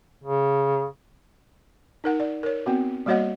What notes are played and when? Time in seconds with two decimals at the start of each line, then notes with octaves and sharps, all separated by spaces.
0.24 C#3
2.04 D#4 A#4 F#5
2.20 D5
2.43 A#4 C#5
2.66 B3 C4 F#4
3.06 G3 A#3 F#4 C#5 D#5 F#5